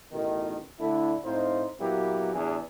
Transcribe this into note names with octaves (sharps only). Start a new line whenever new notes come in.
A1 B2 D#3
D3 A3 D4 E4
A2 C4 D#4 F4 C5
A#2 F#3 A#3 B3 E4 G4
A1 E2 D4 G#4